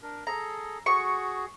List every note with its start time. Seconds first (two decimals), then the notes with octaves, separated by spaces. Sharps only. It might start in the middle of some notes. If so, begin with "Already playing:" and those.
0.02 D4 A#4
0.27 G#4 A4 A#5
0.86 F#4 G#4 C#6